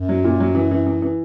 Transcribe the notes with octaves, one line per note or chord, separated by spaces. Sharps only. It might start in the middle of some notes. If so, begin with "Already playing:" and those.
Already playing: F#2
F#3
A#2
F#3
E3
E3
E3
E3